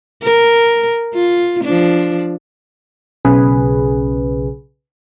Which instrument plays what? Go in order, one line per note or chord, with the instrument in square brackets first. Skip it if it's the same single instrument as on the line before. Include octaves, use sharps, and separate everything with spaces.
[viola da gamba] A#4
F4
F3 D4
[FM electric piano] B1 C#3 G#4 B4